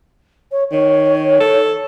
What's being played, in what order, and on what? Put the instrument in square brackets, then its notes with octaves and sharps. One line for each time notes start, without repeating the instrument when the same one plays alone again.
[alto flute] C#5
[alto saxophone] D#3 [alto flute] C#5
[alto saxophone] A4